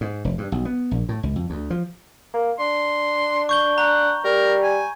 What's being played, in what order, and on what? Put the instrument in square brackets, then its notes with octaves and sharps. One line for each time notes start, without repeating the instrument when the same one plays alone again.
[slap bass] G#2
F1
G2
B1
B3
A#1
A2
C#2
F2
D2
F3
[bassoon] A#3
[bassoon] D4 [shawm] C6
[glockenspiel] C#6 G6 G7
[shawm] F#5 [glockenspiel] A#5
[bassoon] G3 [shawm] A#4
[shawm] G#5